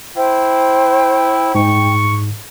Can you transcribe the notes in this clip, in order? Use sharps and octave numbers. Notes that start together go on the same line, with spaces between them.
E4 C5 G5
G#2 C#6